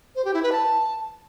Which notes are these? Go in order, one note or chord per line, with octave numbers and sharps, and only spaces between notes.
C5
G4
E4
B4
A5